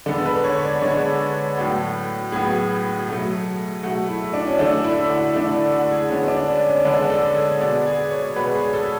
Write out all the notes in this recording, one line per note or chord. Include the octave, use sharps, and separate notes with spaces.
D3 G#3 B3 A4
B4
C#5
D5
D3 G#3 B3 C#5
A2 F#3 B3 A4
A2 F#3 B3 G#4
B2 F#3 A3
B2 F#3 A3 F#4
E4
D4
C#4
D3 A3 D4
E4
F#4
D3 A3 D4
E4
F#4
G#4
D3 G#3 B3 C#4
D4
C#4
C#4
D3 G#3 B3 D4
A4
G#4
B2 G#3 B3 D5
G#4
C#5
B2 G#3 B3 B4
G#4
A4